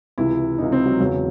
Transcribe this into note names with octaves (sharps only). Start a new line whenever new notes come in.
C#2 C3 E3 E4
C#2 C3 E3 D#4
C4
F#3
E1 E2 C#3 F#3